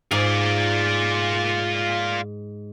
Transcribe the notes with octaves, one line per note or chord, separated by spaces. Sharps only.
G#2 F4 D5